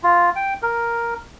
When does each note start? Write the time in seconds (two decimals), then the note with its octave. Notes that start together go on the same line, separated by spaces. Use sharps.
0.03 F4
0.36 G5
0.62 A#4